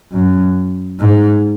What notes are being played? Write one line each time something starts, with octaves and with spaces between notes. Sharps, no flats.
F#2
G#2